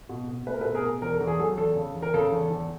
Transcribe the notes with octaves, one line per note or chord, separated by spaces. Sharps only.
B2
B2
A3 B4
A#4
A4 B4
B2
G#4 A#4
B2
E2 A#4
A4
E2
G#4
F#3 A4
E2 A4
C#3
E2
A#4
C#3 A4
E2
E2